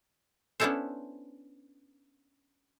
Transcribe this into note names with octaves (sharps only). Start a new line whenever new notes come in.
B3 C#4 D4 E4 A4 C5